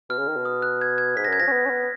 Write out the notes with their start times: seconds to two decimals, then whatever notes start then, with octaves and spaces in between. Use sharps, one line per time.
0.09 B2 F6
0.18 C#3
0.28 D#3
0.36 B2
0.45 D#6
0.62 F#6
0.81 G#6
0.98 G#6
1.16 G#2 B6
1.24 A#6
1.28 F#2 G#6
1.40 F3 A#6
1.47 C#4
1.52 B3
1.65 C#4
1.69 B3